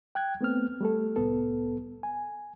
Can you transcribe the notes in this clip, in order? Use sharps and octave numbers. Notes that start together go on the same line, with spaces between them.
G5 F#6 G#6
A3 B3 C4 F6
G3 A3 A4
C2 A2 B3 A4
G#5